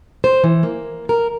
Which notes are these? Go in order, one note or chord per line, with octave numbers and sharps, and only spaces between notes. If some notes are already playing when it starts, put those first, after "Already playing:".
C5
E3
A#3
A#4